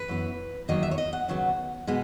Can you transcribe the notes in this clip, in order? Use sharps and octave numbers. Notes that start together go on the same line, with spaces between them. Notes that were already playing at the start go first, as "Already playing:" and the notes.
Already playing: B4
F#2 E3 B3
E2 D#3 F#3 A#3 D#5
E5
C#5
D#5
F#5
D#2 C#3 F#3 B3
B2 G#3 B3